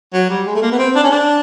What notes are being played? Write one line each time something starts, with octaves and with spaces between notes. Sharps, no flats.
F#3
G3
G#3
A3
A#3
B3
C4
D4
C#4
D4